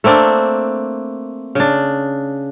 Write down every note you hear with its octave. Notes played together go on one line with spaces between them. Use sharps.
A3 A#3 C4 D4
C#3 D4